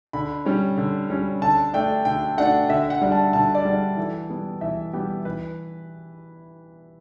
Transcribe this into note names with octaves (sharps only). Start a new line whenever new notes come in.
D3 B5
G3 C#4
D3
G3 C#4
D3 A5
A3 D4 G5
D3 G5
A3 D4 F#5
D3 E5
F#5
G3 D4
A5
D3 A5
D5
G3 D4
E3 A4
G3 B3
E3 E5
G3 B3 G4
E3 B4